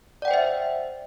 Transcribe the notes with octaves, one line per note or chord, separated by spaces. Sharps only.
C5 D5 E5 F#5 G5